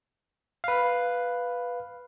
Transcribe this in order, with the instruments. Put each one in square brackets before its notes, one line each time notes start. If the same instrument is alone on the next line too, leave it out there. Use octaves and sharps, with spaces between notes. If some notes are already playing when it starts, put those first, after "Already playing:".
[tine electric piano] B4 F5